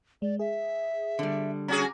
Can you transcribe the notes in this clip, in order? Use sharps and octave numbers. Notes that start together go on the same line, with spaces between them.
G#3 D5
G#4 E5
D3 G3
C#4 F#4 G#4 A#5 D6